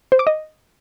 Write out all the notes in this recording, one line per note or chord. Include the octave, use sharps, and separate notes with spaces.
C5
D6
D#5